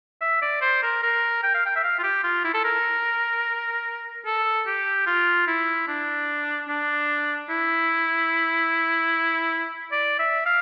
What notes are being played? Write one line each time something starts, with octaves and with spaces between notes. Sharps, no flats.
E5
D5
C5
A#4
A#4
G5
F5
G5
E5
F5
F4
G4
F4
E4
A4
A#4
A4
G4
F4
E4
D4
D4
E4
D5
E5
F5